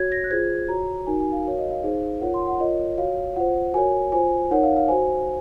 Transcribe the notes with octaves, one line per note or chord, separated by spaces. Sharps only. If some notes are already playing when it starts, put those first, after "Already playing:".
Already playing: F#4 C#5 G#6
A#6
F#6
F4 G#4 C5 G#6
F#4 C#5 A#5
D#4 F#4 A#4 G#5
G#5
F5
F#4 A#4 C#5 F5
D#5
F5
D#4 G#4 C5
F4 A#4 C#5 F#5
C6
F#5
F4 A#4 C#5 D#5
F#4 C#5 F5
F4 C5 F#5
F#4 A#4 C#5 G#5
F4 C5 G#5
D#4 A#4 C#5 F#5
F5
F5
F#4 C5 G#5